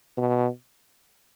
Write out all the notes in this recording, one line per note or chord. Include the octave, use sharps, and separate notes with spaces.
B2